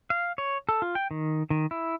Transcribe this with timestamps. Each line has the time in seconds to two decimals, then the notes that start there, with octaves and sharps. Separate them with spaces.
0.10 F5
0.38 C#5
0.69 A4
0.82 F4
0.95 G5
1.11 D#3
1.50 D#3
1.71 E4